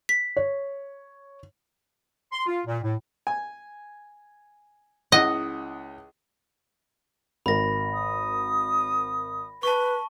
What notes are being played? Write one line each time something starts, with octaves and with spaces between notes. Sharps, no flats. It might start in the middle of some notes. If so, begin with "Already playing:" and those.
B6
C#5
C6
F4
A#2
A2
G#5
C#2 E4 D#5 F#5
G#1 A#4 B5 A#6
D#6
B4 A5 C#6